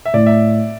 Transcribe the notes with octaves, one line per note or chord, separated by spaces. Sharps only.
E5
A2 D5
E5